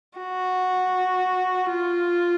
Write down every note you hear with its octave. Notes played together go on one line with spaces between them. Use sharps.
F#4
F4